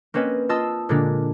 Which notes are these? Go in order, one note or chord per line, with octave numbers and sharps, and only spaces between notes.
A#3 C4 C#4 B4 D#5
F4 D#5 A5 C6 D#6 E6
A#2 D3 G#3 A#3 D4